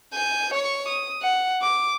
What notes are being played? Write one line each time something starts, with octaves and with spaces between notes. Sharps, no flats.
G#5 G6
C#5 C#6
D#6
F#5
D6